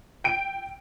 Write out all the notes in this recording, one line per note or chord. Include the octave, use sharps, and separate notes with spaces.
G5 D7